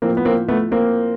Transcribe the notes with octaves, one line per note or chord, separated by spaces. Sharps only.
A2 F3 A#3 C4
B3
A#3 C4
A3 B3
A#3 C4